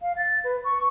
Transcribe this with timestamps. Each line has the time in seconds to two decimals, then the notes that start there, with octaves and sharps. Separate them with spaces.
0.01 F5
0.17 A6
0.44 B4
0.64 C#6